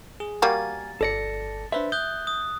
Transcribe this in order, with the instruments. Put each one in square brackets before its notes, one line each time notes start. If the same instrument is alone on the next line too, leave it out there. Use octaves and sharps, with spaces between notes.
[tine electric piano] G#4
[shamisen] G3 A#3 F#4 [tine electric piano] F5 G#5 [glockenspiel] A6
[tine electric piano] G1 A#6 C#7 [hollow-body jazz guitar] A4 D5
[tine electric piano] D4 B4 C5 [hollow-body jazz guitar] E5
[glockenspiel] D#6 F#6 [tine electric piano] G6
[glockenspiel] D#6